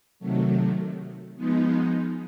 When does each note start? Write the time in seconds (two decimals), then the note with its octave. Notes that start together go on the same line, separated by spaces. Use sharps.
0.19 C3 D#3 F#3 A3
1.36 F3 G#3 B3 D#4